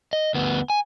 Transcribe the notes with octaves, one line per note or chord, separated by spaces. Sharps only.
D#5
D2 B3
G#5